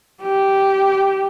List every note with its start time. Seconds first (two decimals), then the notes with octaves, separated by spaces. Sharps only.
0.22 G4